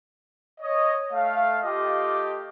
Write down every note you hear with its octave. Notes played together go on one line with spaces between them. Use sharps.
C#5 D#5
A3 F5
A3 F4 G4 D#5 D6